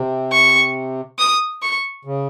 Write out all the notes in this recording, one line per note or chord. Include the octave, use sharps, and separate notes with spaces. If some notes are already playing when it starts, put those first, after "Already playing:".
Already playing: C3
C#6
D#6
C#6
C#3